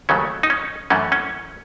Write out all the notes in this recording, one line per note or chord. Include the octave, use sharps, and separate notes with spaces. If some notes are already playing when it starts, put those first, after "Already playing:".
D#2 C#3 F#3 A3 C#4
D#4
C#4
F#2 E3 A3 C#4
C#4